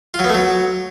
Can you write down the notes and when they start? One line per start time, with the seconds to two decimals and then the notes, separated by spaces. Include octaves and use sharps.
0.14 F4
0.19 F#3
0.24 B3
0.29 A3
0.34 F#3